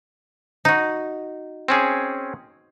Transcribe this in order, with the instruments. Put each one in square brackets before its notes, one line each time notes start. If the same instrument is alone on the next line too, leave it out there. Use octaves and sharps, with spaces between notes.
[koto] D#4 F#4
[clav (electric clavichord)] C4 C#4 G#4